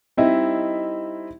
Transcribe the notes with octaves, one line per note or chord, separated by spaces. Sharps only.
G3 C4 D#4 E4 D#5 E5